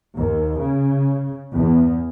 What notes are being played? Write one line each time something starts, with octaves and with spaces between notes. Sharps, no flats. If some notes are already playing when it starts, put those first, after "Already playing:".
D#2
C#3
E2